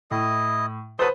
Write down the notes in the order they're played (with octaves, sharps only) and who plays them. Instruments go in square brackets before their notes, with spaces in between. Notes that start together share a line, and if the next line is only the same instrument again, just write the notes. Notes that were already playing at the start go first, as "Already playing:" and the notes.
[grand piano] A2 [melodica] E4 D#5 D#6
[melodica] F#3 A4 D#6 [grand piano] B4 C5